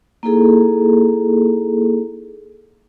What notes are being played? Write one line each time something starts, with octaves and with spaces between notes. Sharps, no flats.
A#3 D#4 E4 G#4 A4